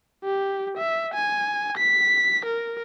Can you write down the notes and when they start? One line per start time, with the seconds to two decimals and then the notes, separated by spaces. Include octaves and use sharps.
0.24 G4
0.78 E5
1.14 G#5
1.78 B6
2.46 A#4